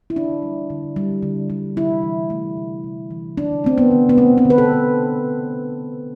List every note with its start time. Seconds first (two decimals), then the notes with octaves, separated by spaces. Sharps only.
0.10 E4
0.16 D3 D4
0.43 G3
0.70 D3
0.96 G3
1.23 D3
1.50 G3
1.77 C3 E4
2.03 E3
2.30 A3
2.57 C3
2.84 C3
3.11 E3
3.37 D3 D4
3.64 A3 C4
3.78 B3
3.91 D3
4.09 B3
4.17 A3 C4
4.38 C4
4.45 D3
4.50 B4
4.58 A4
4.72 A3